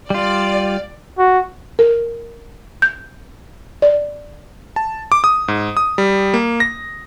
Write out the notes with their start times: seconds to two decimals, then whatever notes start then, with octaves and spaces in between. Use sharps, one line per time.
0.10 G3 F4 D5
1.19 F#4
1.79 A#4
2.82 G6
3.82 D5
4.76 A5
5.12 D6
5.24 D#6
5.48 G#2
5.77 D#6
5.98 G3
6.34 A#3
6.60 A#6